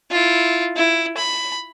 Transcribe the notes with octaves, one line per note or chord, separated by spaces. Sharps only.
E4 F4
E4
B5